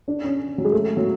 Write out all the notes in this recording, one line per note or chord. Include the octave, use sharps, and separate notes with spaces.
D4
C#4
F#3
G#3
A3
F#3